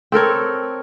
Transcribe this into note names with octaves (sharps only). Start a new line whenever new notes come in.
C4 A4 A#4 C#5